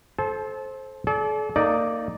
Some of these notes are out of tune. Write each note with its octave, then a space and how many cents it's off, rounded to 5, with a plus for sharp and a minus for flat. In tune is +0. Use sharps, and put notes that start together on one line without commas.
A4 -25 C5 +15 A5 -35
A4 -45 D5 -20
A#3 -25 D#4 +0 D5 +0